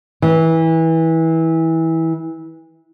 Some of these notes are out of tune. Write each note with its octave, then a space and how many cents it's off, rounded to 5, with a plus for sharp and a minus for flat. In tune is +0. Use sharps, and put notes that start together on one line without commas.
E3 -20